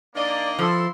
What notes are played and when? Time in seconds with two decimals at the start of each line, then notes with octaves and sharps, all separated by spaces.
0.15 D#3 A#3 D4 D5 D#5
0.59 F3 E4 A4 C6